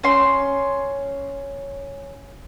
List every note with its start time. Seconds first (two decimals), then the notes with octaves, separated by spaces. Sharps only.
0.04 C#4 C6